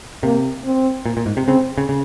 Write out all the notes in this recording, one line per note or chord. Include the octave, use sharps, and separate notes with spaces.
C3 A#3
C4
A#2
A#2
G#2
C3
C#3 C4
C#3
C#3